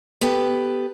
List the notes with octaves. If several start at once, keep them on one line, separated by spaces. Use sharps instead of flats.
B3 G4 A4 B4